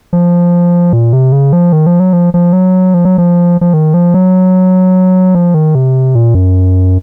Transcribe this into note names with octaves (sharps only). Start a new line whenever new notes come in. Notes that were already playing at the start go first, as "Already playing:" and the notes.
F3
A#2
C3
C#3
F3
D#3
F3
F#3
F3
F3
F#3
F3
F#3
F3
F3
D#3
F3
F#3
F3
D#3
C3
A#2
F#2